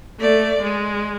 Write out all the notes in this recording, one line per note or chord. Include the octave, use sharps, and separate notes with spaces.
A3 D5
G#3